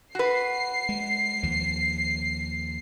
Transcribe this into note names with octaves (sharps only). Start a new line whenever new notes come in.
F#4 B4 C7
G#3
D#2 F3